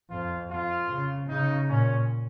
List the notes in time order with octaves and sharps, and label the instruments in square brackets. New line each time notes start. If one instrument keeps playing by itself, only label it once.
[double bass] F2 [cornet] F4
[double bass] F2 [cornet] F4
[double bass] C#3
[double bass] C#3 [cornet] D#4
[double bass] A#2 [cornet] C#4